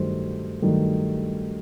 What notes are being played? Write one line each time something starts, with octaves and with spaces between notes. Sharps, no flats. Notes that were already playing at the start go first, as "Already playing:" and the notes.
Already playing: G2 D#3 F#3 A3 C5
G2 D#3 F#3 A3